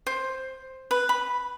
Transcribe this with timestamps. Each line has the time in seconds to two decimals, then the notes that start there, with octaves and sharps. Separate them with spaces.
0.07 C5
0.91 B4
1.09 B5